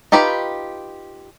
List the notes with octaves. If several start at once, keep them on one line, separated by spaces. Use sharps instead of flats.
D#4 F4 G4 B4 B5